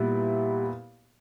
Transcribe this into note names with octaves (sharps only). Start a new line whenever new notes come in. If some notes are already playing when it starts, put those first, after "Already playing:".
Already playing: A#2 G3 B3 E4